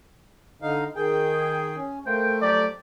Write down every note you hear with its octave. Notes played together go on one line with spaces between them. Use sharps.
D3 D#4 F5
D#3 G#4 G5
C#4
A3 A#3 C5 G5
F2 F#3 G4 D5